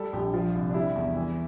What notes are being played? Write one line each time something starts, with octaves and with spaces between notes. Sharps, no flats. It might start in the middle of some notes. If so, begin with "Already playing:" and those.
Already playing: G3 A4
A#1 G4
F3 F4
C2
D4
G3 E4
E2
E3